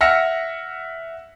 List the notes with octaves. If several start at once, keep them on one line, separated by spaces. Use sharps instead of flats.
E5 F#5 E6 F6 A#6 C#7